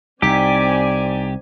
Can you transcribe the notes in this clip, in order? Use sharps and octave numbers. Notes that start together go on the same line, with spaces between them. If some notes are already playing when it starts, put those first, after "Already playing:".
C2 C4 D#4 G4 D5 G5 G#5 B6